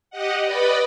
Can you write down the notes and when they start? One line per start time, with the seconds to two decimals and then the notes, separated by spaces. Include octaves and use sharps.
0.10 G4 D#5 F#5
0.44 B4 D5 D#5 B5